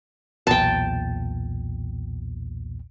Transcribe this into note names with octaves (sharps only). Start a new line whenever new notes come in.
B1 E2 A#2 G5 A5